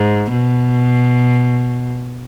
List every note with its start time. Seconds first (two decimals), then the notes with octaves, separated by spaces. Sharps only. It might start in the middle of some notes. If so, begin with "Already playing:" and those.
Already playing: G#2
0.32 B2